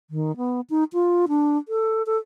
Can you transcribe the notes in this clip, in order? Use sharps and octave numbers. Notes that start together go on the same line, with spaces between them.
D#3
B3
D#4
F4
D4
A4
A4